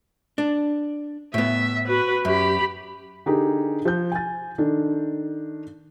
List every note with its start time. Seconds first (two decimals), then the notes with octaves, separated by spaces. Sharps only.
0.38 D4
1.34 A2 B3 E5
1.86 F#4 B4
2.25 F#2 G4 B5
3.26 D3 D#4 G4 G#4 A#4
3.85 F3 G6
4.12 G#5 A6
4.58 D#3 D4 A4